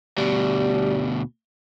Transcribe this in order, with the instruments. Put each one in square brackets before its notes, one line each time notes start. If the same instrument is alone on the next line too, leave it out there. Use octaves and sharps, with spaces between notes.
[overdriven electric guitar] D2 B2 [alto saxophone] G3